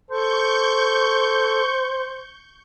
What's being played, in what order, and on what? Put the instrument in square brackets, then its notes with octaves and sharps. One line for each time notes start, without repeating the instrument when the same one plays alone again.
[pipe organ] A4 [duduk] C5 [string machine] C#6 G6